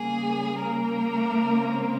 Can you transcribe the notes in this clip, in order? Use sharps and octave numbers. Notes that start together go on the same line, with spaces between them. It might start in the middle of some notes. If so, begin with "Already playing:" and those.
Already playing: C#3 G3 A#3 G#4
A#3 A#4
C#3 G#3 C4